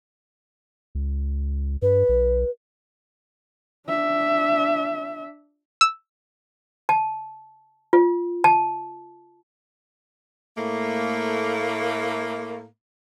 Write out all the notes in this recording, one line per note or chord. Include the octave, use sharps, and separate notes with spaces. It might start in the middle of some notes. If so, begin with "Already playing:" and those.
C#2
G2 B4
B1
D4 E5
E6
A5
F4
A5
A2 A3 A#3